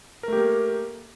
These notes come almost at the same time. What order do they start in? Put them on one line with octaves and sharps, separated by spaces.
A#4 A3 G4 A#3